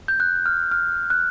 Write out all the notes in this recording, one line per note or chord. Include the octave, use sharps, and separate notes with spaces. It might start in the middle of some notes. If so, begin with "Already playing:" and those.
G6
F#6
F6
F6
F#6